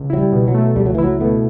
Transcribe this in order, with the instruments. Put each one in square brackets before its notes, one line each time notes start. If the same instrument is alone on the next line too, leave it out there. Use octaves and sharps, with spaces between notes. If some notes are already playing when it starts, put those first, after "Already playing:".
Already playing: [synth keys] C#2
[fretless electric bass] F#3 [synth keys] E4
[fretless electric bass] G3
[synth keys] B2
[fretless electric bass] F#3
[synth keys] A3
[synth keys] C#2 [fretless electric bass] G3
[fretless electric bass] F#3
E3
[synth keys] E4
[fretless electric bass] F#3
[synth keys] B2 [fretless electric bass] A3